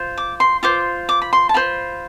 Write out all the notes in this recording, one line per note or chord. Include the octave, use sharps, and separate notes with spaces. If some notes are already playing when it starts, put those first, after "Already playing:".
Already playing: F4 C5
D6
C6
F4 C5 D6
D6
B5
C6
A5
F4 C5 B5